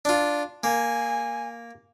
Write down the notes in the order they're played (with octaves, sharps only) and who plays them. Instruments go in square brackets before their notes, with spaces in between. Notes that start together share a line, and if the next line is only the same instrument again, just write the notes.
[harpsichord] D4 F4
[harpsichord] A#3 [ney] G#5